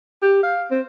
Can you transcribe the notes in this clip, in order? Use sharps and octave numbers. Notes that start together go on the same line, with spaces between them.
G4
F5
C4